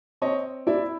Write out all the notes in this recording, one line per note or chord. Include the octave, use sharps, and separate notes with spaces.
C4 C#5 D#5
E4 D5 E5